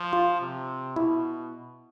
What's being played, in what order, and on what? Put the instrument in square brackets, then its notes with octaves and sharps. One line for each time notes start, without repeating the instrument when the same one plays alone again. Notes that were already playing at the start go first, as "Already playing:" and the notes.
Already playing: [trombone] F3
[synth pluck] F4
[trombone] C3
[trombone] B2 [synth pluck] E4